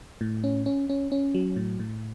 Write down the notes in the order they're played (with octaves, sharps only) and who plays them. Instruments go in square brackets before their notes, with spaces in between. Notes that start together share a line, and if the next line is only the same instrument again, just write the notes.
[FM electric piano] A2
C#4
C#4
C#4
C#4
F#3
A2
A2